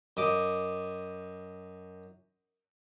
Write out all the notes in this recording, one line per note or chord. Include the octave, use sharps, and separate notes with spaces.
F#2 D#5 D6